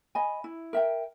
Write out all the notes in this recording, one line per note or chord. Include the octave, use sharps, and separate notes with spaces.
D#5 G#5 B5
E4
A#4 E5 G5